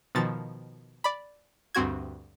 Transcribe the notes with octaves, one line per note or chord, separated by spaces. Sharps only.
B2 D#3 F3 A6
D5 B5
D2 G2 C4 F#4 G#6